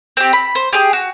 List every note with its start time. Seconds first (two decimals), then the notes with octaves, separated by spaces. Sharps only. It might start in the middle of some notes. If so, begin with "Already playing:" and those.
0.17 C4 G4
0.33 B5
0.55 C5
0.73 G4 G#4
0.93 F#4